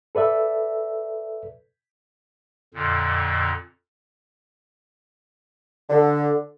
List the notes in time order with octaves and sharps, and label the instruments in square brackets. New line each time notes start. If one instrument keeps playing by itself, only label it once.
[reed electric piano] A4 B4 D5 E5
[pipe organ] F2 A#2 D3
[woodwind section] D3